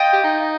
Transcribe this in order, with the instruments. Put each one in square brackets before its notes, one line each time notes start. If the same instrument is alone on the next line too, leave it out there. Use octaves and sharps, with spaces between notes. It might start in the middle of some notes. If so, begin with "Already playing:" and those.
Already playing: [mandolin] F4 D#5 G5
[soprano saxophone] G4
D#4